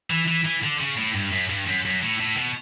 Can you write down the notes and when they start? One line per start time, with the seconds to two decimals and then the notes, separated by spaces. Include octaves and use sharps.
0.10 E3
0.28 E3
0.45 E3
0.63 D3
0.81 C#3
0.98 A2
1.15 G2
1.33 F#2
1.50 G2
1.67 F#2
1.85 F#2
2.03 A2
2.20 A2
2.38 B2